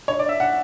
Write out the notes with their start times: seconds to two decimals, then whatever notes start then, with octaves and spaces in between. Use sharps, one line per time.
0.08 C#5
0.19 D5
0.29 E5
0.40 F#5